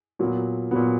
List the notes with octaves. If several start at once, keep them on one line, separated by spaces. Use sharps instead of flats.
A#2 F#3 B3
A#2 F#3 B3